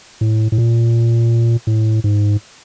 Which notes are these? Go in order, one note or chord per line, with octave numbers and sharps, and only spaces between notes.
A2
A2
A#2
A2
G#2